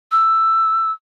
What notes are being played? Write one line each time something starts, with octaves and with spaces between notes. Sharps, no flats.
E6